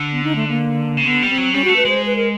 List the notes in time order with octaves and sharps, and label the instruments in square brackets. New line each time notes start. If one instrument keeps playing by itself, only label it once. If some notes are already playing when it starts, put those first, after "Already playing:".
Already playing: [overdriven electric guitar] D3
[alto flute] B3
D#4
A3
A#3
[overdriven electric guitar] C#3
[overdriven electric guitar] D3 [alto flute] B3
[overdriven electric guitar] G3
[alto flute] C4
[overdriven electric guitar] F#3
[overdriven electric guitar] G3 [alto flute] C#4
[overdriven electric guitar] A3 [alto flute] F#4
[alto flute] B4
[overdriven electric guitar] G#3 [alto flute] C5
[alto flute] B4
A#4